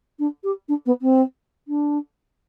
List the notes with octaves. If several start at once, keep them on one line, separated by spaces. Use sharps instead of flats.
D4
G4
D4
B3
C4
D4